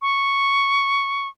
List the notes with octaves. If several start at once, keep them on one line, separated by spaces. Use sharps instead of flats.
C#6